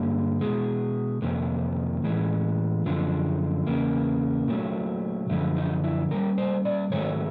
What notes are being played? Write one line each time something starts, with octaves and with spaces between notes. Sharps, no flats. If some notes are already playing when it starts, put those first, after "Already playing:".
Already playing: G2 D3 G#3 A#3
B2 G#3
F2 C3 D#3 A#3
A2 E3 G#3
F#2 D3 F3
E2 C#3 A#3
A#2 F#3 A3
F#2 D3 F3 A3
D#4
E4
A#2 G3 A#4
C5
D5
G#2 D#3 F#3 A3 C#5